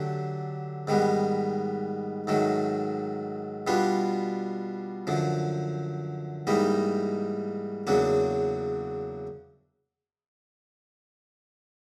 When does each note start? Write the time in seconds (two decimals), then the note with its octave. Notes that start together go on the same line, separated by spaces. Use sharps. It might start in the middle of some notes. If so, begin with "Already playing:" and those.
Already playing: D3 F#3 A3 D4 G4
0.87 G#2 D#3 G3 B3
2.27 G#2 D#3 F#3 A3
3.67 B2 G3 B3 D4 F4
5.07 F#2 D3 F3
6.47 G#2 E3 G3 A#3 D#4
7.87 E2 C#3 F#3 A#3 D4